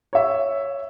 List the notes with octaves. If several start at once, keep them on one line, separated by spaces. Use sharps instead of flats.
C#5 E5